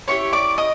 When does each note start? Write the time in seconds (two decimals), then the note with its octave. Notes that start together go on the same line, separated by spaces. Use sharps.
0.08 C#4 E4 G4 C#5 C#6
0.33 D5 D6
0.58 D#5 D#6